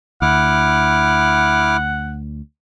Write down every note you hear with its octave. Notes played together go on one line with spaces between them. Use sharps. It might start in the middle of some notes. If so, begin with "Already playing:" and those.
D2 E4 F#5 D6 F6